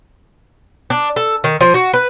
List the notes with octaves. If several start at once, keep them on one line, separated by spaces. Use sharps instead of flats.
D4
A4
D#3
F3
F#4
B4